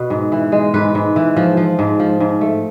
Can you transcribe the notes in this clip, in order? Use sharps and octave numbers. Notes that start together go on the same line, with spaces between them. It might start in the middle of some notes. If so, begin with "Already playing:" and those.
Already playing: B2 B4
G#2
E3
G#3
G#2 B4
G#2
E3
F3
F3
G#2
F3
G#2
A3